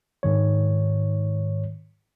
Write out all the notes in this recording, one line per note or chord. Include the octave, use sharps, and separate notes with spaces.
G#2 D#3 C#5